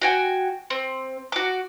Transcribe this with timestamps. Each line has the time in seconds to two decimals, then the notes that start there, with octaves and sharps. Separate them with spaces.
0.02 F#4 G5 G#5
0.70 C4
1.32 F#4 D6